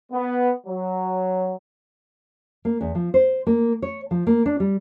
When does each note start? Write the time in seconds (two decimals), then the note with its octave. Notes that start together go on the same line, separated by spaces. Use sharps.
0.12 B3
0.67 F#3
2.65 A#3
2.81 E2
2.95 F3
3.14 C5
3.47 A#3
3.82 C#5
4.11 F3
4.27 A#3
4.46 D4
4.60 G3